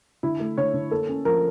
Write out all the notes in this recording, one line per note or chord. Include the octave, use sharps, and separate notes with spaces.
D3 E4
A3
D3 C#5
D3
A#3 A4
C#4
F3 A#4